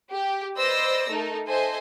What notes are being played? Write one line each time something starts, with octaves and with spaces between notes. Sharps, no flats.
G4
B4 C5 D5 D#5 E6 A#6
A3 D#4 A4 A#4
A4 C5 D#5 E5 G#5